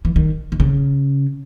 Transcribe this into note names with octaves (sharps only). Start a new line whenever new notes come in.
E3
D#3
D#3
C#3